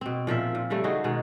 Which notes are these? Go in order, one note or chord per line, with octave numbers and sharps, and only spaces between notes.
B2 C4
A#2 F3 A#4 E5
A#2
C#3 G3 A3
D#4 F#4 G#4 C5
B2 D#3 G#3